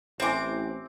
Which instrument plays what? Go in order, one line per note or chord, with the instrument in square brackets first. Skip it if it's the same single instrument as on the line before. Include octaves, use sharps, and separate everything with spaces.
[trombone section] A1 [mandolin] C4 D6 [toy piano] C5 E5 G#5